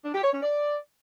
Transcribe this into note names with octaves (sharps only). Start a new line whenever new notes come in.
D4
G4
C#5
C#4
D5